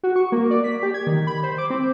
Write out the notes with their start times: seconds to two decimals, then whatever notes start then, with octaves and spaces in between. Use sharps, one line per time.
0.03 F#4
0.16 C#6
0.32 A#3
0.51 D5
0.64 B6
0.83 G4
0.94 G#6
1.07 D#3
1.27 B5
1.43 C5
1.58 D6
1.70 C4